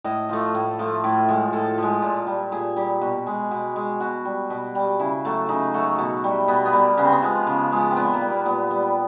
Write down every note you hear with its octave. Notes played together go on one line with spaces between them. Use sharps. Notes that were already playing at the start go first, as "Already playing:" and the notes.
A2 D#5
F3 A3
A2
F3 A3
A2
F3 G#3
A2 A4
F3 G#3
A#2
G3
A#2 G#4
G3 G4
B2 F#4
G#3
B2
G#3
B2 F#4
G3
B2
G3
C#3 E4
F#3 A3
C#3 D#4
F#3 A3
B2
G3
B2 B3
B3
G3 A#3
C#3 B3
C4
B3
F3 G#3
C#3
F3 G#3
C4
A#2 B3
A#3
G3
B3
A#2 B3
G3